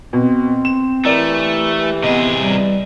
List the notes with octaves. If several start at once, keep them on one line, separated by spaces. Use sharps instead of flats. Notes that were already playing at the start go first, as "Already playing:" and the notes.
B2 C4
E7
E3 A3 G4 A#4 D5
C3 B3 G#4 D#5
G3